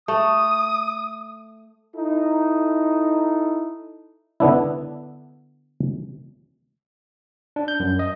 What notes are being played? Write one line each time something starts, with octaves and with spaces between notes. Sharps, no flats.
A3 D#6
D#4 E4 A4
D3 B3 D4 E4
D4
G6
F#2
D#5